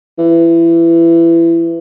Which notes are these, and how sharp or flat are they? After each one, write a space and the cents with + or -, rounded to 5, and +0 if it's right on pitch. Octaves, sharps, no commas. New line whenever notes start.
E3 +20